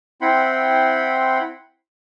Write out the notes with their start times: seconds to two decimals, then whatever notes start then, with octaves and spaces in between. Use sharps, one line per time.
0.21 C4 E4 F#5 G5 B5 C6